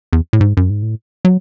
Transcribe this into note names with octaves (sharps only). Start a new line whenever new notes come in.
E2
A2
G#2
F#2
G#2
A2
F#3